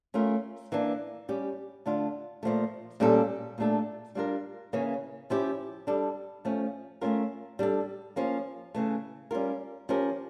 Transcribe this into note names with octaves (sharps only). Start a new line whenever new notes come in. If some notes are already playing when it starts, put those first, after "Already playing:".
A3 C#4 F4 A#4
E3 A#3 D4
G3 C#4 G4
D3 A3 D4 F4
A#2 F3 A3
A#2 G3 C#4 F4 A4
A#2 A3 D4 A4
G3 D4 F4 A#4
C#3 E3 A#3 C#4
F3 C#4 E4 G4
G3 D4 A4
F3 A3 C#4
A3 C#4 F4 A#4
G3 D4 A4
F3 A#3 C#4
C#3 E3 A3
G3 C#4 F4 A#4
F3 C#4 G4 A#4